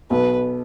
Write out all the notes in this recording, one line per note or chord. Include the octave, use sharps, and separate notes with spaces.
B1 B2 B4